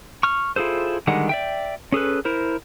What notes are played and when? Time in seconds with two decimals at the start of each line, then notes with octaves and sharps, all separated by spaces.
0.23 C#6 F6
0.56 E4 F4 G#4 A4 C5
1.07 D3 D#3 G3 G#3 F#5
1.29 D5 E5 G5
1.92 C#4 G#4 A4 B4
2.25 E4 A#4 C5